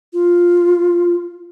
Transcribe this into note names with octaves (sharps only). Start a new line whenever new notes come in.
F4